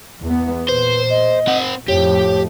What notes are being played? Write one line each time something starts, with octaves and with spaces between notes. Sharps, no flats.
E2 B3
A#2 B4 C5
D#5
C4 F#5
F2 A2 F3 G4 C#5